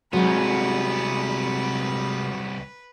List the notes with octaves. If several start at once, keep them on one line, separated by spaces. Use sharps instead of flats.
C2 C3 F#3 G#3 B3 B4